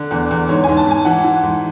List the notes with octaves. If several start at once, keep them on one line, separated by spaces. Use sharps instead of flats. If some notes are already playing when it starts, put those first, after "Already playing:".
Already playing: D3
E2
E2
G#2 C#5
G#2 G#5
A5
G#2 G#5
E3 F#5
E3
G#2